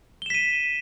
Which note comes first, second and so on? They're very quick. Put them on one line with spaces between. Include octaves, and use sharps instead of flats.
G7 E7 B6 D#7